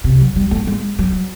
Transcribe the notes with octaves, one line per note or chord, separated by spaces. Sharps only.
C3
F#3
G3
A3
G#3
F#3